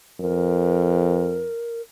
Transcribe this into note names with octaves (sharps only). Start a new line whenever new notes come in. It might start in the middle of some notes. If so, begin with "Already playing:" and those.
F2 A#4